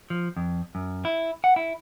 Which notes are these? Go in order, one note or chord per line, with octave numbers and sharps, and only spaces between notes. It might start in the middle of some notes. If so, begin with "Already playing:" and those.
F3
F2
F#2
E4
F#5
E4